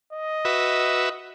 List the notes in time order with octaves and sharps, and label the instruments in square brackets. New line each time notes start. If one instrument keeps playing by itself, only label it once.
[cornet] D#5
[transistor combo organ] F#4 B4 E5